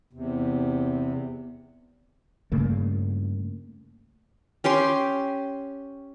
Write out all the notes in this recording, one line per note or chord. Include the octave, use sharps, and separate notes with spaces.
E2 C3
G2 C#3 A3 A#3
C#4 G4 G5 C6